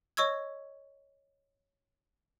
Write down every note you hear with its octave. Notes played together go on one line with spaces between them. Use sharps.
C#5 D#5 C#6 E6 G#6